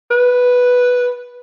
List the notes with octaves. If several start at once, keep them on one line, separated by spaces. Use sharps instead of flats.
B4